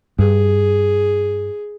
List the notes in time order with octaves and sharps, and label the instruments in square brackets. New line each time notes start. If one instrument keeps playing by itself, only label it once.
[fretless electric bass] G2 [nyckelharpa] G#4